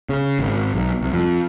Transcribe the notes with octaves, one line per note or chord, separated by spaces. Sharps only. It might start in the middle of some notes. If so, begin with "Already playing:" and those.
C#3
G#1
B1
C2
F2